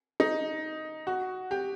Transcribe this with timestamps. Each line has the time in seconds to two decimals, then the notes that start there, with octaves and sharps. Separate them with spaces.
0.20 D#4
1.07 F#4
1.51 G4